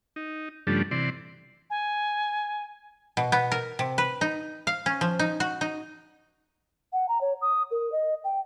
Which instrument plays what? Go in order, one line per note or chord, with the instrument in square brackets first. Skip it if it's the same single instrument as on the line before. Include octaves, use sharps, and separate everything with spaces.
[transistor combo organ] D#4
G2 C#3 F3 G3 A3 D4
C3 E3 D5 C6
[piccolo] G#5
[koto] B2
B3
A#4
C3
B4
D#4
F5
C#4
F3
D#4
F#4
D#4
[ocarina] F#5
A#5
C#5
D#6
A#4
D#5
G5